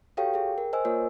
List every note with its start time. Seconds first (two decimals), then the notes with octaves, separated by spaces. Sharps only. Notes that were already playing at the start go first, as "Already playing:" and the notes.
0.17 F#4 G4 A4 C#5 F5 G5
0.34 G#4 G5
0.58 A#4
0.73 C5 D#5 G#5 E6
0.85 A#3 F4 A#4 C#5